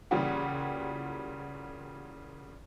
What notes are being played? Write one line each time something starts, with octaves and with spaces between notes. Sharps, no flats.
A#2 C#3 E3 G3 F#4 G4